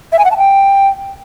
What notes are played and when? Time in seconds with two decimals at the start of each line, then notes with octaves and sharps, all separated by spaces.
0.12 E5
0.19 G#5
0.25 F#5
0.31 A5
0.38 G5